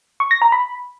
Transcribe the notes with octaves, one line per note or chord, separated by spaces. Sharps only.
C#6
A#6
A#5
B5